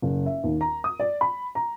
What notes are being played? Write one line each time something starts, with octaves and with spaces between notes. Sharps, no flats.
F#1
E5
D#2
A#5
D#6
D5
B5
A#5